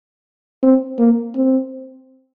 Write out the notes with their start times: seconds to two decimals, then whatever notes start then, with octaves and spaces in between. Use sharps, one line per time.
0.63 C4
0.99 A#3
1.35 C4